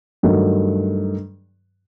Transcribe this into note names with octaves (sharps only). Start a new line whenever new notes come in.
G2 D#3 F#3 A3